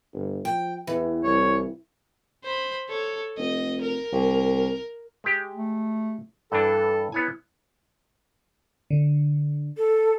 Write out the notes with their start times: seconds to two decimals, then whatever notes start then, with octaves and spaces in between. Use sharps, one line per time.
0.13 G1
0.45 F3 G5
0.87 E2 E3
1.24 C2 C#5
2.44 C5 B5
2.89 A4 C#5
3.38 F1 D#5
3.82 A#4
4.13 C2
5.24 G#3 G4
5.55 A3
6.52 G2 E3 D4 A4
7.12 B3 E4 C#5 G#5
8.90 D3
9.77 A4